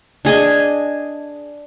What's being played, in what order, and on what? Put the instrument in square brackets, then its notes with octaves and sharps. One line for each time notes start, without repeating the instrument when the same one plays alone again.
[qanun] D4 G#4 D#5 G#5